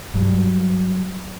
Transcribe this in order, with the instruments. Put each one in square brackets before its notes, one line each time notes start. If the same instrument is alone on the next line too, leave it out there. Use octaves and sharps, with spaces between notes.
[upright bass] G2 F#3